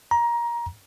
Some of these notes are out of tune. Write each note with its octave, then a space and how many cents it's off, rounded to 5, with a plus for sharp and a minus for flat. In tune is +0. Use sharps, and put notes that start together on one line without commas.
A#5 +20